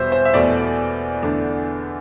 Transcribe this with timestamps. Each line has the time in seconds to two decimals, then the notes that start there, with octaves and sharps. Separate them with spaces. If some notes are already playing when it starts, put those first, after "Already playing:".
Already playing: E2 B2 G3 C5 E5
0.12 C5
0.25 E5
0.34 E2 B2 A3 D5
1.23 E2 D3 A3 D4